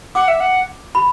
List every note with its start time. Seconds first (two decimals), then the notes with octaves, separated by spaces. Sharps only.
0.15 F#5 D6
0.28 E5
0.40 F#5
0.95 B5